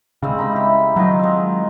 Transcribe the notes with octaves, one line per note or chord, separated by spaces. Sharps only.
C#3 G3 G#3 C4
D#4 B5
E4 G4
D#3 F3 F#3 D#4
G#3 C4